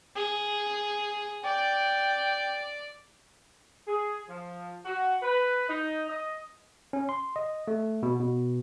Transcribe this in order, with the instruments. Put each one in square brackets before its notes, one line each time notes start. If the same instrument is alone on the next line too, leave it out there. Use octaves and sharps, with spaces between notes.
[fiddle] G#4
[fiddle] D5 [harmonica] G5
[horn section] G#4
F3
F#4
B4
D#4
D#5
[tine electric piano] C#4
C6
D#5
A3
B2
B2